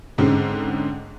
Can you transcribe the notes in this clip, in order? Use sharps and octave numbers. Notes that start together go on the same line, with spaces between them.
G#2 D3 G#3 C4 C#4